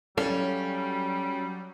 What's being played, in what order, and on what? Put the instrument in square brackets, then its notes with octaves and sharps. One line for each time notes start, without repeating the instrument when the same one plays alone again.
[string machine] F#3 [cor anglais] G3 [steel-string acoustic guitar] C#4 [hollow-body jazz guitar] A4 D5 F5